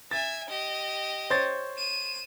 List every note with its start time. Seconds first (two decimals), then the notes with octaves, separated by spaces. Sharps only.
0.11 E5 G#5 A6
0.49 G4 D#5
1.30 C5 C#5 A6
1.77 D#7 E7